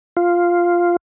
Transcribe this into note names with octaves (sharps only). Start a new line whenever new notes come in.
F4